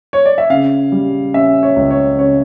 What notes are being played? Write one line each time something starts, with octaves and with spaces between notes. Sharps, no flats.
C#5
D5
E5
C#3 F5
G3
C#4 E5
C#5
C#2
C#5
C#3 C#5